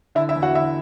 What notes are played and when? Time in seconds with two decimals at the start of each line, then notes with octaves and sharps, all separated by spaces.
0.15 D3 E4 E5
0.29 E4 E5
0.36 E2
0.42 F#4 F#5
0.55 D3 E4 E5